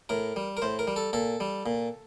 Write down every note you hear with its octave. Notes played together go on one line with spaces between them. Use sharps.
A2 A#4
G3
A#4
A2 C5
A#4
G3
A4
A#2 A4
G3
A#2